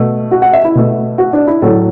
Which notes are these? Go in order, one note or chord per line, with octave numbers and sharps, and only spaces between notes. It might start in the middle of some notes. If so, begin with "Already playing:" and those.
Already playing: B2 A3
F#4
F#5
E5
E4
B2 A3
F#4
D4
E4
A2 F#3 A3 A4